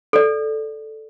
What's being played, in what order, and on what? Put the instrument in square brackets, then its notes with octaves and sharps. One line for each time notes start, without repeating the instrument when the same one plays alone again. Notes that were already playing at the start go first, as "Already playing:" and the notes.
[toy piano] A4 D5